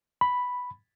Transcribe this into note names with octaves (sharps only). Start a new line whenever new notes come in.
B5